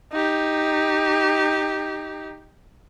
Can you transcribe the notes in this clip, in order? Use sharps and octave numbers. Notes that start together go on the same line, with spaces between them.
D#4 G4